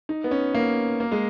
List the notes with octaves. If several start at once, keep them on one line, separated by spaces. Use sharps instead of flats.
D#4
B3
C#4
A#3
A#3
G#3